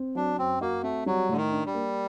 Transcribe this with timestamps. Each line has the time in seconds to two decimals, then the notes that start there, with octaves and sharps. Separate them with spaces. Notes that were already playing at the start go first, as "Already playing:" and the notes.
Already playing: C4
0.15 F#3 D4
0.38 F#2 C4
0.61 A#3 F#4
0.83 A3 C4
1.06 F#3 G3
1.29 A2 D3
1.37 D#3
1.51 D4
1.66 G3
1.74 A#3